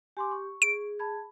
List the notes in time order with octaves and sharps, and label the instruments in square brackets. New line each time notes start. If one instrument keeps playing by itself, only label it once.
[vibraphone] G4 [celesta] G#5 C6 D6
[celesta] C#6
[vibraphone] G#4 [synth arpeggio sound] D7
[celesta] A5 B5 G#6